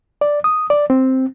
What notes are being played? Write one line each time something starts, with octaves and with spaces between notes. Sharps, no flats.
D5
D#6
D5
C4